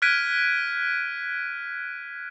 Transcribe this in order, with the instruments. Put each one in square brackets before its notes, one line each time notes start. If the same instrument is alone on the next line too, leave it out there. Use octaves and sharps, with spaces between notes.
[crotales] F6 F#6 G#6 B6 D7 D#7